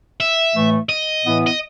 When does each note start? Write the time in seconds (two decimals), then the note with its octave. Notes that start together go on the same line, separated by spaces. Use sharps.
0.20 E5
0.54 A2 E3 A3
0.89 D#5
1.23 A2 E3 B3 E4
1.47 D#5